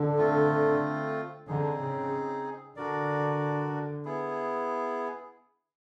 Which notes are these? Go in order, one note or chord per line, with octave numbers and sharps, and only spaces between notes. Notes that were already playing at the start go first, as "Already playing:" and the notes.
Already playing: D3
A3 C4 F4
D3 C4 D#4 G#4
C#3
D3 D4 F#4 A#4 D5
B3 E4 G#4